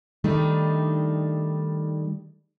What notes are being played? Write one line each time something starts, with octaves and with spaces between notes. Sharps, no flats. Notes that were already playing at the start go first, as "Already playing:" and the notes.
D#3 G3 A3 D4 D#4